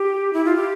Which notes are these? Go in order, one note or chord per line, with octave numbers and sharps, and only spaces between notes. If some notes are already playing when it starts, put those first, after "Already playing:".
Already playing: G4
E4
F4
G4